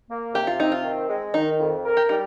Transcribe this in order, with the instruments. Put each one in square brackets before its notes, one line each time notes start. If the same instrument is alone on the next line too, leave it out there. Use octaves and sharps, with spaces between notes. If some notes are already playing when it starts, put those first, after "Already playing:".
[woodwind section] A#3
[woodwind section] C3 [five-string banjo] G4
[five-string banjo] F4
[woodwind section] C4 [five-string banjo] D#4
[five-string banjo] F4
[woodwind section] D#3
G#3
[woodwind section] D#3 [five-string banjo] D#4
[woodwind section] F2
A#4
[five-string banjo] G4
[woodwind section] G3 [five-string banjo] D#4